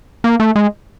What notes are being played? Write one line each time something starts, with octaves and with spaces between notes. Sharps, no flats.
A#3
A3
G#3